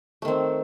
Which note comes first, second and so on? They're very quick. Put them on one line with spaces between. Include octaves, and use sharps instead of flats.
A3 D#3 C4